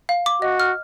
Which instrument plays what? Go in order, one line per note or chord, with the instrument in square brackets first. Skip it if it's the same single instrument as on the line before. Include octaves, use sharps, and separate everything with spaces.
[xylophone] F5
D6
[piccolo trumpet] F#4 [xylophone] D#5
[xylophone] F6